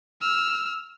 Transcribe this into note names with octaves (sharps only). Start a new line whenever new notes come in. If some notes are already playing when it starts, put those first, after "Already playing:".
E6 F6